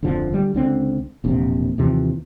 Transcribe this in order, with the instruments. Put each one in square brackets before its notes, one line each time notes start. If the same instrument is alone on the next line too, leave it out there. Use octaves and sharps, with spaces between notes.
[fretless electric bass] D1 F2 D3 F3
D3 G3
C#2 D3 C4
E1 A#1 C3
D#2 C3 E3 F3